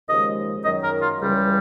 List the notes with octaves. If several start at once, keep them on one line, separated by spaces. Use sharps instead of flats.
D#2 C#3 F3 G#3 D#5
F#2 D#3 F#3 D#5
A#4
F4
C#2 C#3 E3 G3